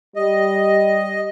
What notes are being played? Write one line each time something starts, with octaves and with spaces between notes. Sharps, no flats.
G3 D#5